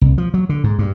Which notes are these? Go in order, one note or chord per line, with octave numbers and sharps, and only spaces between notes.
C2
F3
F#3
D3
G#2
G2